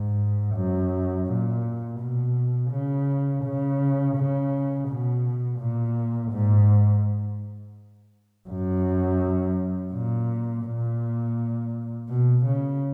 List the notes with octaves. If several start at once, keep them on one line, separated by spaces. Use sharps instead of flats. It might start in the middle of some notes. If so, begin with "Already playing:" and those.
Already playing: G#2
F#2
A#2
B2
C#3
C#3
C#3
B2
A#2
G#2
F#2
A#2
A#2
B2
C#3